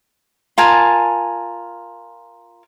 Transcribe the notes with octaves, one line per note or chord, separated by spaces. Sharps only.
F4 A#4 G#5 A5